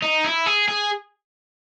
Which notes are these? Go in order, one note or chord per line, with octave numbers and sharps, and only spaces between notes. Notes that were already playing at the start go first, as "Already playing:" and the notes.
D#4
E4
G#4
G#4